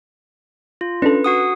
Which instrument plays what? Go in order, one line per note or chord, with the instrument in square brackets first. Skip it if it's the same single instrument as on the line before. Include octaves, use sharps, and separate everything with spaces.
[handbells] F4
[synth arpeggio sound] C#4 D4 A4 [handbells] B4
[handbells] F#4 F#5 D#6